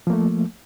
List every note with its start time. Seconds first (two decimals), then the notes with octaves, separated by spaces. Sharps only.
0.07 F3
0.10 A#3
0.13 A3